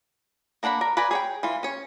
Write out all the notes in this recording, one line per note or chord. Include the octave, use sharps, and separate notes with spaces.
A#3 D4 F#5 A#5 B5
A#4
B4 D5 G#5 A#5 B5
G#4 C#5 G5
E3 F4
C#4 C#5